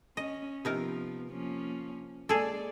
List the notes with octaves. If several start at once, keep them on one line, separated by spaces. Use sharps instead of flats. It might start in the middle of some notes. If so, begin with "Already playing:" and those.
C#4 D#5
C3 F3 B3 D#4 A#4
F3 A#3 C#4
G#3 A#3 G#4 A4 D5